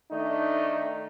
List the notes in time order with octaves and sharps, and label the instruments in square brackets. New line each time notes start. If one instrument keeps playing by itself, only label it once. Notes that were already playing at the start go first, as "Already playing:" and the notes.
[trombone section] D#3 A3 D4 D#4